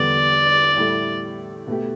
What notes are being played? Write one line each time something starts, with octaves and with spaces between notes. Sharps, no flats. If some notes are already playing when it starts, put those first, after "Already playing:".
Already playing: E2 D3 G3 B3 D5
A2 G3 E4 A4
B2 A3 G4